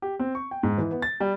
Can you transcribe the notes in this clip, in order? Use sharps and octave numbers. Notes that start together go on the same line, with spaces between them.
G4
C4
C#6
G5
G#2
E3
B3
A6
G3